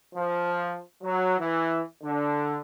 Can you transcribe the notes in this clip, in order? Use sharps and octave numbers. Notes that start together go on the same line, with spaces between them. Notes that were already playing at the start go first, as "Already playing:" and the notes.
F3
F#3
E3
D3